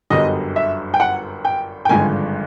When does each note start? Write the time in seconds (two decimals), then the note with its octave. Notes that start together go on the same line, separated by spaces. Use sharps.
0.10 G1 F#2 D3 G3 D#5
0.56 E5
0.94 G5
1.00 F#5
1.45 G5
1.85 G5
1.89 G#1 G2 D3 F3 G#3 G#5